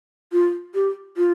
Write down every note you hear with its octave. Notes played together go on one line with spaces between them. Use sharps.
F4
G4
F4